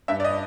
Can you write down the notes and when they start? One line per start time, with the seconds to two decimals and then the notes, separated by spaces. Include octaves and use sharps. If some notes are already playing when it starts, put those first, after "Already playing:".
0.08 G2 E5
0.20 D5
0.24 D#5